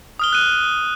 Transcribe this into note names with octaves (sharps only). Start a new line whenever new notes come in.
D#6 F6 G7
F#6 D#7